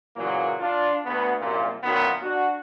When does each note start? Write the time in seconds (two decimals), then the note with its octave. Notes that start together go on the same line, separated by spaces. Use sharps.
0.16 A#2 C#3 E3 F#3 A#3
0.60 D4 F4
1.05 D2 B3
1.40 C2 F#2 A#2
1.83 F#2 A#2 D#3 F#3 B3
2.23 D4 F#4